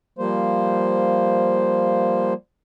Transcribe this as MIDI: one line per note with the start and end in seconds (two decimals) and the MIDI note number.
0.19 2.33 53
0.19 2.33 55
0.19 2.33 58
0.19 2.33 72